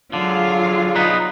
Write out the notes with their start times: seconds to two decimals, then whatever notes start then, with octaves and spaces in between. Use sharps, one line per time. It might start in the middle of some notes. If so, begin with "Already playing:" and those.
0.13 D3 F#3 F4 G#4
0.95 B3 D#4 B4